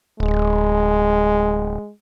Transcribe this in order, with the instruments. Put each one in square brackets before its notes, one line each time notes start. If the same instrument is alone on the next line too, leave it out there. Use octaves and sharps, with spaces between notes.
[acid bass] D1 [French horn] G#3